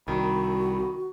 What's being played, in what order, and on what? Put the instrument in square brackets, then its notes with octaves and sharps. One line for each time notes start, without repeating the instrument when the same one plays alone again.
[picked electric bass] C2 [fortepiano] D#3 [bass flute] F#4 [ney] B5